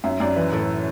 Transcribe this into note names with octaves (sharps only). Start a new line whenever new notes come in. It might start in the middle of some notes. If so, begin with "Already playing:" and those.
F#2 E5
F#2 D5
E3 B4
A2 A4